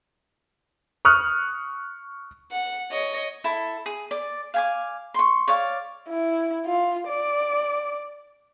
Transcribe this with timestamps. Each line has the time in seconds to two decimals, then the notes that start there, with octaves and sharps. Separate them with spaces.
1.05 C#6 D#6 F6 F#6
2.51 F#5
2.91 C#5 D#5
3.44 E4 A4 A5
3.86 G#4
4.11 D5
4.54 F5 G#5 D6
5.14 C6 C#6
5.48 C#5 D5 F5
6.09 E4
6.66 F4
7.08 D5